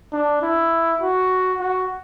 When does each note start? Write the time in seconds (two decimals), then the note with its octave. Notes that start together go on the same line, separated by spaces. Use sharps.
0.13 D4
0.42 E4
1.01 F#4
1.60 F#4